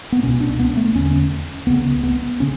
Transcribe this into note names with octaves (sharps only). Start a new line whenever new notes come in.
B3
C#2 B2 C#4
D4
B3
A3
E2 D3 C#4
C#2 C#3 B3
B3
C#3 C#4